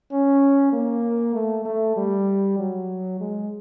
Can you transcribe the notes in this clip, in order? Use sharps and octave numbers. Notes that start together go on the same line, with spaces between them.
C#4
A#3
A3
A3
G3
F#3
G#3